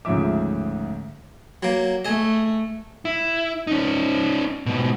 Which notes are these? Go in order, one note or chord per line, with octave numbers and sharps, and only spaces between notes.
D2 G#2 C#3 F3 E5 D6
F#3 A#3
A3 D#5 G#5
E4
C#4 D#4
G#2 B2